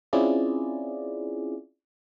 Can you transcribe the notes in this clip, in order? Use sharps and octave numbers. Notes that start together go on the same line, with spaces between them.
C4 C#4 E4 F4 G#4 D5